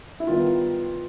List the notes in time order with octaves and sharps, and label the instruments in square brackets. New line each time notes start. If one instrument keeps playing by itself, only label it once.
[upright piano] E4
D#3 G3 B3 F4